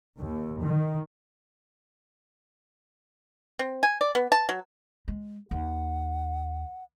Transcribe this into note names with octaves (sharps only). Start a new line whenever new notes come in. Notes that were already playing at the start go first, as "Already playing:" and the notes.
D#2
D#3
C4
G#5
D5
B3
A5
F#3
G#3
D#2 F#5